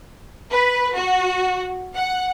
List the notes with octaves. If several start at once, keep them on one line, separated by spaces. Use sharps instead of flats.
B4
F#4
F#5